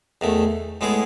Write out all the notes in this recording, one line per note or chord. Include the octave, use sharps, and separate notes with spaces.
E2 D#3 A3
A2 G#3 B3 E4 G#4